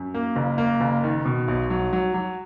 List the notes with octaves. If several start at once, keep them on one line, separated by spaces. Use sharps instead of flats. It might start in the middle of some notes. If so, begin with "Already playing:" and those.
Already playing: F#2
A#3
F#1
A#3
F#1
D#3
B2
B1
F#3
F#3
F#3